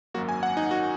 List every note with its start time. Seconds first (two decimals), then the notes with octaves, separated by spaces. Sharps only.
0.14 G#1 F#2 F#3 A#3 F#4
0.29 G#5
0.43 F#5
0.57 D#4
0.71 F#4